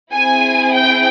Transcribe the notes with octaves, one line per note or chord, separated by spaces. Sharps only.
C4 E4 G#4 G#5
G5